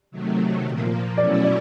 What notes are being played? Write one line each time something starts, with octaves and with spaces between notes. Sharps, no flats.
C3 D#3 F#3 A3
A#2 F3 A#3
B2 F#3 A3 C#4 E4 D5
D5